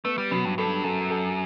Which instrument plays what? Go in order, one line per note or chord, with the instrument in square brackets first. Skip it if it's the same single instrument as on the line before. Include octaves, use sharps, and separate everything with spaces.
[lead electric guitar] A3 [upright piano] B3
[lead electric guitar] G3
[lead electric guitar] B2 [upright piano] F#3
[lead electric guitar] G2
[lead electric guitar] G2 [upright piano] A4
[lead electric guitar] F#2 [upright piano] A4
[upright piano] A4